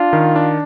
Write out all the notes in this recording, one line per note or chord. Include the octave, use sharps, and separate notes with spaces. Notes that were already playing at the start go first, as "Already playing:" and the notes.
Already playing: D4 F4
D#3
D4